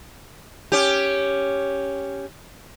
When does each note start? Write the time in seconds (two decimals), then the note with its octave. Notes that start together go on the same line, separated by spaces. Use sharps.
0.72 C#4 G4